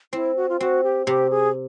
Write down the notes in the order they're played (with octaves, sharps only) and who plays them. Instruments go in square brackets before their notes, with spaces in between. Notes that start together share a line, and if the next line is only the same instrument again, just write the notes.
[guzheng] C4 [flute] E4
[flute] F#4
F4
[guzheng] C4 [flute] F#4
[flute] G4
[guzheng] C3 [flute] G4
[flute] G#4